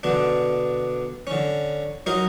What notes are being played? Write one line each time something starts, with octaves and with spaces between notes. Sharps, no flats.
B2 D3 D4
D3 C#4
F#3 D#4 A#4 D#5